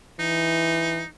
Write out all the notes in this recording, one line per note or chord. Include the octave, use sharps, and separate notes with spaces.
E3 D#4